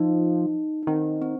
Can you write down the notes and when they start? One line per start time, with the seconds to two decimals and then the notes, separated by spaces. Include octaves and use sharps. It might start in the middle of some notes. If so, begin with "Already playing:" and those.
Already playing: F3 D#4
0.83 D#4
0.87 D#3 C4
1.22 C4